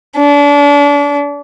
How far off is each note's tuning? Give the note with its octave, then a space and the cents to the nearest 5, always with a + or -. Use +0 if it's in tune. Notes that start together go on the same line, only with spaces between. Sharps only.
D4 -35